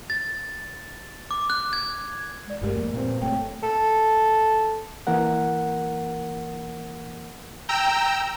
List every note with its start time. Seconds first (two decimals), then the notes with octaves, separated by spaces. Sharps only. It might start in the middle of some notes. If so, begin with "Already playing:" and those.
0.10 A6
1.31 D6
1.50 F#6
1.73 G#6
2.47 G#3 D5
2.61 G1 G2 G#3 A3 G4 A#4
2.76 F2 A#3
2.94 A#2 C4
3.22 F#1 A3 C4 C#5 G5
3.63 A4
5.07 E3 A#3 A#4 F#5
7.69 G5 A#5 E6